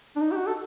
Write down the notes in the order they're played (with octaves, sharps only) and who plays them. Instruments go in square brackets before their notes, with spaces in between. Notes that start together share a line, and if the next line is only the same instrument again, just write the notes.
[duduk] D4
D#4
G4
F#4
A4